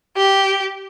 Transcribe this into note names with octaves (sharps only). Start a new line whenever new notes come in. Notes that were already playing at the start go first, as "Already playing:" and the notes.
G4